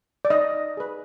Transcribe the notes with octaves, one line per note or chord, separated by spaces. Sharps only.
D5
D#4 D#5
G#4 B4